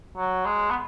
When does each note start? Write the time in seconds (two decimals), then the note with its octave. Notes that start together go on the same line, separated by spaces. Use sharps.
0.17 F#3
0.45 G#3
0.70 B3